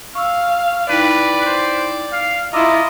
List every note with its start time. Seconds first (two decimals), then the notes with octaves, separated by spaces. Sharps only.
0.15 F5 C#6 E6
0.90 D#4 E4 B4 D5 G5
1.46 C5
2.13 F5
2.53 E4 F4 D#5 A#5 D6 E6